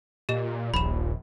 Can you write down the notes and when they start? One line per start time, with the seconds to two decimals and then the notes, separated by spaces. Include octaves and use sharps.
0.29 A#2 G4 D#5 E7
0.74 D#1 A#1 B5 E7